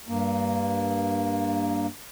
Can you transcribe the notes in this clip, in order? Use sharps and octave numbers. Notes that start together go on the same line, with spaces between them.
G2 A#3